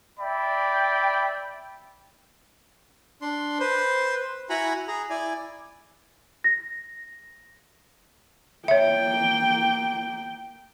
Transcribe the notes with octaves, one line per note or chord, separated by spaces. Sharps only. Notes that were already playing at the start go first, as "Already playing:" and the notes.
D5 E5 G5 B5
D4 C6
B4 C5
E4 F#4 F#5 G#5 A#5 B5
G#4 A#5
E4 D5 G#5
A#6
A#3 C#5 E5 G5